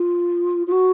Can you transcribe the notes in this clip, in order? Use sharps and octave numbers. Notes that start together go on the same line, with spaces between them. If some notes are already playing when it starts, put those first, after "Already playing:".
Already playing: F4
F4
F#4